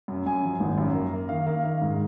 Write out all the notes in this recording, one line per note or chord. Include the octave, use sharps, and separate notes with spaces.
F#2
F#2 G#5
F3
G#1
F#2
A#3
A#3
D#3 F5
A#3 F5
D#3 F5
G#2